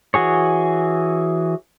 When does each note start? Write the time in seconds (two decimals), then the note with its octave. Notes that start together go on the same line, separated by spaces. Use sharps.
0.14 E3 F#4 G#4 C#5